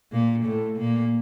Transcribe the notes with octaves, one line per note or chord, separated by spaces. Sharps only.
A#2 A#3
A2 A3
A#2 A#3